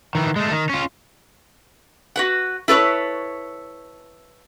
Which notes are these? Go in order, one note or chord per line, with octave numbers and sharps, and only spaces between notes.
D#3 E3
G#3 A3
D#3
C#4 F4
F#4 B4 F#5
E4 A4 B4 C#5